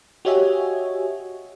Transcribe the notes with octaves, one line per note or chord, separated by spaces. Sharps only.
F#4 G4 C#5 D#5 E5 G#5